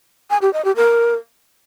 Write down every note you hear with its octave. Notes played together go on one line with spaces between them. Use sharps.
G#5
G4
D#5
G4
A#4